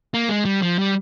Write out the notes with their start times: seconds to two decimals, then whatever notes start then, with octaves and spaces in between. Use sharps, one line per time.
0.14 A#3
0.29 G#3
0.45 G3
0.62 F3
0.79 G3